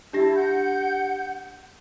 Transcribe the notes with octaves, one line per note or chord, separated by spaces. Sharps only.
D4 E4 G4 A5 A#6
F#5 G6